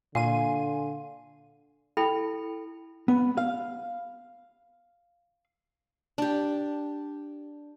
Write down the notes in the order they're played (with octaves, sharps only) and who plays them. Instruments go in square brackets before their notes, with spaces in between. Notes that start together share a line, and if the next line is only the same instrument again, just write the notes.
[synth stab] A#2 D#7 [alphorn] D3 [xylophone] F5 [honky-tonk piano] G#5 C6
[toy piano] E4 A4 G5 B5
[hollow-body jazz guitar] B3
F5
[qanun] D4 G4